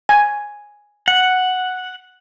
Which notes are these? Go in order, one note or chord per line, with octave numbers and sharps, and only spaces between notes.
G#5
F#5